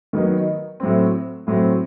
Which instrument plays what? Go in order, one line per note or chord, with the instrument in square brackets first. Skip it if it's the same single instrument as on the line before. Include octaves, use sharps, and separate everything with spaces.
[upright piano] D#3 F#3 B3 D#4
A2 F#3 C4
A2 F#3 C4